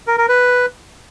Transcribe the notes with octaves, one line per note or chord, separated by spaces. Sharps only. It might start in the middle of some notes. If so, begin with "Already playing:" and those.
A#4
A#4
B4